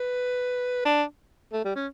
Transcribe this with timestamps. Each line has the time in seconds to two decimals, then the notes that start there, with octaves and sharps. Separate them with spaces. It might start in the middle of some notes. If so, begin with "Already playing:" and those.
Already playing: B4
0.85 D4
1.53 A3
1.64 G3
1.75 C#4